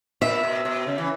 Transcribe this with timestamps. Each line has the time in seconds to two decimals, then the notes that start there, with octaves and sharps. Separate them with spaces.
0.21 A#2 E5
0.43 B2
0.65 B2
0.87 C#3
0.98 E3